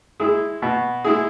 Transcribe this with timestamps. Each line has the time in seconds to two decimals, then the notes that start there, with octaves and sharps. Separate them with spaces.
0.20 G#3 E4 G#4
0.62 B2
1.05 G#3 E4 G#4